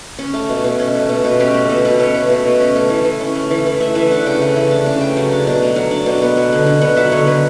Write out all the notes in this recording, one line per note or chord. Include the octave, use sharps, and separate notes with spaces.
C#4
A3
B2
B2
C#4
A3
B2
B2
C#4 G4
A3
B2 A4
B2 B4
C#4 C#5
A3
B2
B2
C#4
A3
E3
E3
C#4
A3
E3
E3
A3 E5
E3 E5
D4 F#5
C#3 G5
A3
E3
D4
C#3
A3 G5
F#3
D4
B2
A3
F#3
D4
B2
B3
F#3
D3
D3
B3 F#5
F#3 E5
D3 C#5
D3 B4